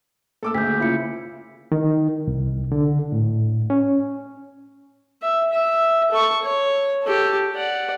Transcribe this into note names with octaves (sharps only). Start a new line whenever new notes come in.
A3 A#3 A4 D6 E6
D2 G#3 G6 B6
C#3 A#3 E4 F4 C#7
D#3
C2
D3
A2
C#4
E5
E5
A4 C#6
C#5
G4 A4
D5 F#5